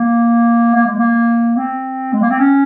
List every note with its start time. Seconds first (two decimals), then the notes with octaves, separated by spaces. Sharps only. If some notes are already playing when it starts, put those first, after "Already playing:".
Already playing: A#3
0.75 A#3
0.86 G#3
0.98 A#3
1.57 C4
2.13 G#3
2.22 A#3
2.30 C4
2.39 C#4